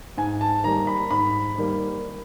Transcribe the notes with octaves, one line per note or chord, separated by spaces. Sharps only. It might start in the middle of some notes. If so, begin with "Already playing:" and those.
G#2 G#5
A5
D#3 G3 A#3 A#5
B5
G#2 B5
D#3 G3 A#3